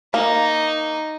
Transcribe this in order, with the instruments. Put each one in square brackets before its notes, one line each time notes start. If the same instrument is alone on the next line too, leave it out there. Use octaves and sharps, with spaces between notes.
[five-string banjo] A#3 [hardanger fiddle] D#4